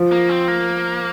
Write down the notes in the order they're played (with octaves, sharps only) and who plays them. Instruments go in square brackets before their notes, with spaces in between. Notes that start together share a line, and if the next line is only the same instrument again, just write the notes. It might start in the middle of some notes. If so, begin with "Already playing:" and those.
Already playing: [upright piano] F3
[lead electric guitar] A#3
C4
A#3